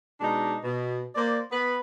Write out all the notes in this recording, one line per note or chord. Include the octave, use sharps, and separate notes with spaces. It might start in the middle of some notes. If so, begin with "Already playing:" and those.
B2 G#3 D4 D#4
B2
A#3 C5 D5
B3 B4